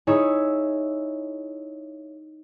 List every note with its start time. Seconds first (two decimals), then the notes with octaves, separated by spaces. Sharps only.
0.07 D#4 E4 G#4 C#5 E5